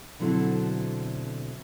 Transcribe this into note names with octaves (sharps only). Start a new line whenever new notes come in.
B2 D3 F#3 C4 E4 A4